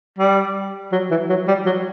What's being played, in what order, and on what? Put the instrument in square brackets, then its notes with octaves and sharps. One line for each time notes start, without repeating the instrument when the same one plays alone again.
[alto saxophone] G3
F#3
E3
F#3
G3
F#3